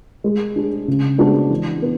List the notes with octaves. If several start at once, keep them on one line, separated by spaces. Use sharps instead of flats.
G#3
D4 G#4
C#3
G#3 B3 D4 F#4
E3
B3